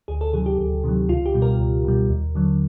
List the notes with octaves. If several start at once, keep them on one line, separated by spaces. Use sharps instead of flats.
D2 G#4
A4
C3 D#3 F#3 G#4
G4
D2
C3 D#3 F#3
C#2 F4
G4
B2 G3
A#4
C#2
B2 G3
D#2
D3 F#3